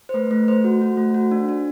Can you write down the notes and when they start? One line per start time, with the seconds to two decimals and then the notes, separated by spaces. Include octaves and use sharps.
0.09 C5
0.14 A3 B4
0.31 A3
0.48 A3 C5
0.64 F#4
0.82 F#4
0.97 A3
1.14 F#4
1.31 D4
1.49 D4